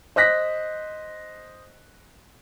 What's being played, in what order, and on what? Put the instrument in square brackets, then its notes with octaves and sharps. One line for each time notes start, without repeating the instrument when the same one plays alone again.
[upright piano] C5 D#5 F#6 A#6 B6